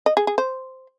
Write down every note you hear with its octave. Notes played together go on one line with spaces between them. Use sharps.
D#5
G#4
G#4
C5